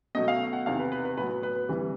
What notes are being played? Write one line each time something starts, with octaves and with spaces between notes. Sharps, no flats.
B2 F#3 A3 D#5
F5
F#5
E2 C3 D#3 F5
B4
B4
B4
A2 F#3 B3 B4
B4
B4
B4
D2 C3 E3 G3